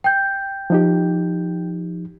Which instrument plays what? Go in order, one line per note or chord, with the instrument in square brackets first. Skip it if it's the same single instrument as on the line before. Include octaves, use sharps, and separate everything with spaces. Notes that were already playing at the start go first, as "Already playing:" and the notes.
[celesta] G5 G6
[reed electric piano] F3 D#4 G4